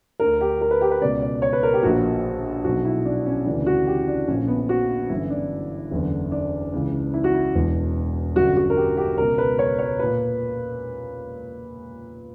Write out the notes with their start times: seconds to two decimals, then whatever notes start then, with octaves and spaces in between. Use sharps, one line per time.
0.20 D2 D3 A#4
0.41 G4
0.61 A#4
0.71 B4
0.81 G4
0.91 B4
1.01 C#2 B2 D5
1.22 D5
1.42 C#5
1.53 B4
1.63 A#4
1.73 G4
1.83 A#1 A#2 F#4
2.64 B1 B2 F#4
2.85 E4
3.05 D4
3.26 C#4
3.46 D2 C#3 E3 D4
3.66 F#4
3.87 G4
4.08 D4
4.28 A#1 A#2 C#4
4.48 B3
4.69 F#4
5.09 G1 F#2 E3 E4
5.30 D4
5.91 F#1 E2 D3
6.32 D4
6.73 C#2 C#3 E3
7.14 E4
7.24 F#4
7.34 E4
7.55 E1 E2 B2
8.36 G1 F#2 D3 F#4
8.57 F#4
8.70 A#4
8.77 G4
8.97 G4
9.18 C#2 B2 A#4
9.38 B4
9.59 C#5
9.79 C#5
9.99 A#2 B4